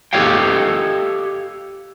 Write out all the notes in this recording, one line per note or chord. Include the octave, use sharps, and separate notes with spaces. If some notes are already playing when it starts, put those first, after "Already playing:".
G4 A4 C#5 D#5 F5 G5